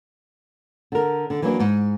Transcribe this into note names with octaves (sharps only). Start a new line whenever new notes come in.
D3 A#4
D3
E3 F#3 A#3 D4
G#2